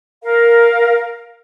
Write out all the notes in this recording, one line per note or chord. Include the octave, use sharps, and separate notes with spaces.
A#4 F5